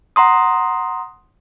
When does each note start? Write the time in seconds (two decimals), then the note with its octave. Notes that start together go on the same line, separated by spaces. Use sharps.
0.16 F#5 A#5 C6 D#6